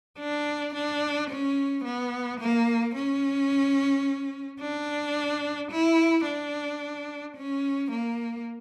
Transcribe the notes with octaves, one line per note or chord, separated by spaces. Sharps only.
D4
D4
C#4
B3
A#3
C#4
D4
E4
D4
C#4
A#3